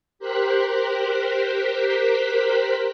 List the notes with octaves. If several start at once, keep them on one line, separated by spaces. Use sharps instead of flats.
G4 A#4 C5 F#6 B6